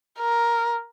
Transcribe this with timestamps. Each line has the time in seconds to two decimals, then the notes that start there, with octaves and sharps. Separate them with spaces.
0.19 A#4